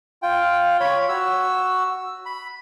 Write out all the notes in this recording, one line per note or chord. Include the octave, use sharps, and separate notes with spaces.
F4 G5
C#5 B5
F#4 E6
B5